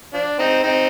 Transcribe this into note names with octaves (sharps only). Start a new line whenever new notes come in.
F3 D4
C4 D#4
C4 D#4